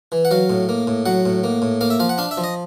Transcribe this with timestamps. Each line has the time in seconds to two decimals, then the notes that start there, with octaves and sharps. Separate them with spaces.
0.12 E3
0.25 F#5
0.31 F#3 F5
0.50 A2
0.69 A#3
0.87 A2
1.06 F#3 F#5
1.25 A2
1.44 A#3
1.62 A2
1.81 A#3 F5
1.90 E5
2.00 F3 F5
2.09 F#5
2.18 D4 F5
2.31 E5
2.37 F3
2.44 D#5